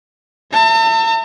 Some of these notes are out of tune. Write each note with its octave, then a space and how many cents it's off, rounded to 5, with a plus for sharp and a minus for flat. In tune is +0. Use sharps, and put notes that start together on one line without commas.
E5 +0 A5 +45